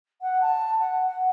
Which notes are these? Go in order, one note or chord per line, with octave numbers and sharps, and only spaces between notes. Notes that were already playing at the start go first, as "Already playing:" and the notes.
F#5
A5
F#5
F#5